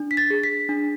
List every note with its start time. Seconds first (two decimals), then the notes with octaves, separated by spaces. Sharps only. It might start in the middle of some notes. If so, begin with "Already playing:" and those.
Already playing: D4
0.11 B6
0.17 A6
0.30 G#4
0.43 B6
0.69 D4